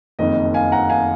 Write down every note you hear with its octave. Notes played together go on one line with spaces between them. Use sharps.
F#1 F2 D#3 D#5
F5 G#5
F#5 A#5
F5 G#5